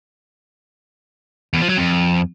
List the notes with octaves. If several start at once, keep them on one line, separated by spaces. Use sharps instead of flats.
E2
F3
F#3
F2